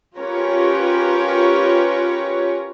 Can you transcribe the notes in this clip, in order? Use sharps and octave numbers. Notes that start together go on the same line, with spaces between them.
C#4 F4 G4 A#4 B4 C#5